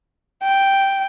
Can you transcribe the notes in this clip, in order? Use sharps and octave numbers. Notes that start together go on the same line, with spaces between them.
G5